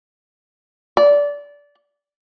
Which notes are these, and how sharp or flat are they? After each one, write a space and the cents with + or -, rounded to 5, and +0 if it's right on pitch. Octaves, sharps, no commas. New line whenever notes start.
D5 -20